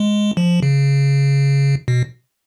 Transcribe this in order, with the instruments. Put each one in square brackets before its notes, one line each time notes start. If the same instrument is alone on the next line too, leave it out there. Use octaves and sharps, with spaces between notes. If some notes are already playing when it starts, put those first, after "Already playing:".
Already playing: [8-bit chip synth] G#3
F3
C#3
B2